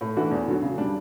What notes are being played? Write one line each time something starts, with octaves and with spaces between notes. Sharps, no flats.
A2
E3 A3 D4 F#4
E2
D3 F#3
C#3
G3 D4